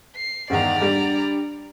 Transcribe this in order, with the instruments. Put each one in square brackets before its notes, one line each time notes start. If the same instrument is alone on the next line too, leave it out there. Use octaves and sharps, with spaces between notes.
[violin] C7
[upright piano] G1 E2 D#3 [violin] D5 A#5 [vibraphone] F#5
[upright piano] G3 [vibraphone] D4